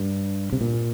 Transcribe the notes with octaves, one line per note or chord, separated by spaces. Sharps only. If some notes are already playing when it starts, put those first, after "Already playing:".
Already playing: G2
C3
A#2